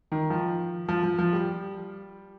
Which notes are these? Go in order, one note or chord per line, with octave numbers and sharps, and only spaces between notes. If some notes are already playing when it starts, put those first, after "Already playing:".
D#3
F3
F3
F3
F3
G3